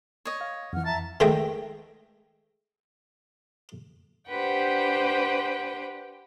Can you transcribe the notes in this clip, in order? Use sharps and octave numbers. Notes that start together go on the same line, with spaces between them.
C#5 D#5
F5
F2 E3 F#5 F6
E5 A5 A#5
D#3 G#3 A3 D#5 E5 G5
D4 G4 B4 C5 F#5 G5